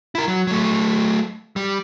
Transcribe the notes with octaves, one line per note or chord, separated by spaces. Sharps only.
E4 A#4
F#3
F#3 A3
G3